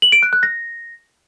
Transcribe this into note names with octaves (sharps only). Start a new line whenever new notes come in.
F#7
D7
F#6
F#6
A#6